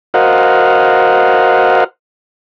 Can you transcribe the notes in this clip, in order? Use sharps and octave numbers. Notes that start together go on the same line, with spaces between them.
F#4 A#4 C5 D#5 F5 F#5